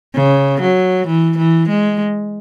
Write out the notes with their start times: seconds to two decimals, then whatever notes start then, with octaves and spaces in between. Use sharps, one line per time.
0.15 C#3
0.61 F#3
1.07 E3
1.38 E3
1.69 G#3